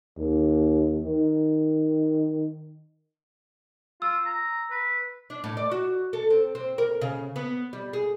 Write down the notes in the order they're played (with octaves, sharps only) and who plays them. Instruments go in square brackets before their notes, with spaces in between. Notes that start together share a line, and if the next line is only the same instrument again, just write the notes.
[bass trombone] D#2
D#3
[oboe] F4 [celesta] E6
[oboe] A#5
B4
[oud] D4
A2
D5
F#4
A4
C4
C4
A#4
C#3
B3
G3
G#4